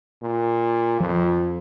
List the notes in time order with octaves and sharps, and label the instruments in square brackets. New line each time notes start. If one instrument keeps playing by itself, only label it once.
[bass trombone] A#2
[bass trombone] F2 [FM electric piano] F3